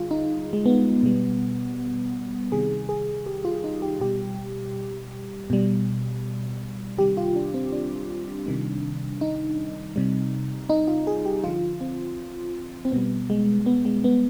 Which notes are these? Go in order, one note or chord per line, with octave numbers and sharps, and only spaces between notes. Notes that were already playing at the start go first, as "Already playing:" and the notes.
Already playing: D3 G3 F4 G#4
D#4
G#3
B3
B2 G3
C3 D#3 G3 G#4
G#4
G4
F4
D#4
G4
B2 G3 G4
B2 G3
C3 D#3 G3 G4
F4
D4
C4
D4
C3 D#3 G3
D#4
C3 G3
D#4
F4
G#4
G4
D3 F3 F4
C4
C4
B2 G3 B3
G#3
B3
G#3
B3